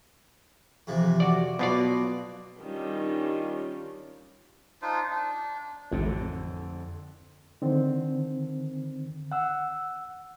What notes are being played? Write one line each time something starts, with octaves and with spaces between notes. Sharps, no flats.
F2 C3 E3
F#4 D5
B2 F#3 F4 D5
D#3 G3 C#4 D4 F4
D4 D#4 F4 C5
D4
A1 F2 D3
D3 D#3 C4
F#5 E6